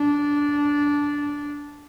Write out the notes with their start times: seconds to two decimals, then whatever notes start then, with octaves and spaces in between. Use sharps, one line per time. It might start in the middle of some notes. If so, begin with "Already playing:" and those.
Already playing: D4